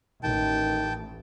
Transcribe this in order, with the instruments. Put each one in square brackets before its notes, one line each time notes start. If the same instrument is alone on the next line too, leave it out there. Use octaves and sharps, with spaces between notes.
[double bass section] A1 [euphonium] D#3 [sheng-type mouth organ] G5 A5